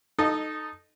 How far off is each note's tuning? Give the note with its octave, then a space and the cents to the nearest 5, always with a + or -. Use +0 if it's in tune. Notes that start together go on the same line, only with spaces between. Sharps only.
D#4 -10 A4 +0 D#5 -25